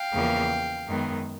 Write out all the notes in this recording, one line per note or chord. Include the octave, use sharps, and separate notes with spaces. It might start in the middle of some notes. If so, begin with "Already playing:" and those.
Already playing: F5 G5
E2 C#3 F3 A#3
F#2 D#3 G#3 B3